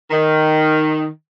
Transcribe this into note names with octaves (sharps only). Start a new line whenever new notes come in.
D#3